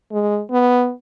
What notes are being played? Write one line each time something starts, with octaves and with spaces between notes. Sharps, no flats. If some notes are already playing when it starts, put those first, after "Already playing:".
G#3
B3